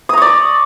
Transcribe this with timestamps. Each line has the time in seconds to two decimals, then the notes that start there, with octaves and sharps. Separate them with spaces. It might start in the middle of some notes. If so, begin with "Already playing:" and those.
0.09 D#6
0.13 A#5
0.18 C#6
0.22 D5